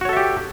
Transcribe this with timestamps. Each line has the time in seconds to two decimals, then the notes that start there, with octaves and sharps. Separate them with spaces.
0.01 F#4
0.05 C#5
0.09 A4
0.13 E5
0.17 G4